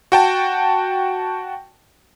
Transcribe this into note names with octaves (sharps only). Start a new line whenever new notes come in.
F#4 G5 A5